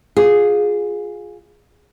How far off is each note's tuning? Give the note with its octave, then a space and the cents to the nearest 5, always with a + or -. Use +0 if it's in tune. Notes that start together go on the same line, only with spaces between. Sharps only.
F4 +20 G#4 +0